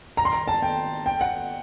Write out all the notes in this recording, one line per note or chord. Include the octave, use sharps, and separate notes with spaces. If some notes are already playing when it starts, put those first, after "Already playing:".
A#5
C6
A#5
A5
G5
G5
F#5